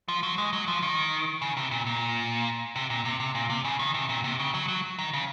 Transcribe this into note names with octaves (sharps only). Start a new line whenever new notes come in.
F3
F#3
G#3
F#3
F3
D#3
C#3
C3
A#2
A#2
C3
A#2
C3
C3
A#2
C3
C#3
D#3
C3
A#2
C3
C#3
F#3
F#3
D#3
C#3